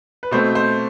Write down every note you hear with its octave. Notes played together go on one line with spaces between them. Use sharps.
B4
B2 A3 C4 C5
C5